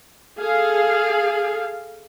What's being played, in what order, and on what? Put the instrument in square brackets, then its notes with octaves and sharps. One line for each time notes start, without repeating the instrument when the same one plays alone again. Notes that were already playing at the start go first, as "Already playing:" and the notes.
[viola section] G#4 A4 F5